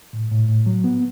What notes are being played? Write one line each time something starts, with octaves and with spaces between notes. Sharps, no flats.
A2
A2
A2
F#3
B3